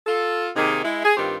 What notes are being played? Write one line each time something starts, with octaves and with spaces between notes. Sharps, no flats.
F4 A4
C3 D#3 A#3 D#4 G#4
G#3 E4
G#4
G2 D#3 C4 F4 G4